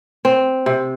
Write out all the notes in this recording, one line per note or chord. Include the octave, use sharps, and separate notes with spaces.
C4
C3